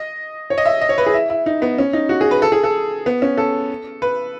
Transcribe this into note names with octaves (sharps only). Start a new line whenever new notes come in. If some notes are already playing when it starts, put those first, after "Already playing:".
Already playing: D#5
C#5
D#5
E5
D#5
C#5
B4
G#4
E4
E4
D#4
B3
C#4
D#4
F#4
G#4
B4
A4
G#4
A4
B3
C#4
A4
B4